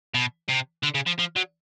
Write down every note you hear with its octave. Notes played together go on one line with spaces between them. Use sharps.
B2
C3
D3
C#3
F3
F3
F#3